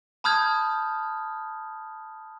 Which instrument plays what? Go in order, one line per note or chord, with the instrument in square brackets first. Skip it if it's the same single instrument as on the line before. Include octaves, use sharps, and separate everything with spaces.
[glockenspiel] A5 B5 D#6 F6 G6 G#6